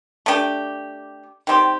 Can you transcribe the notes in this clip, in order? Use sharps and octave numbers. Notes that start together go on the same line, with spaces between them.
A3 D4 G4
D#3 G3 C4 G4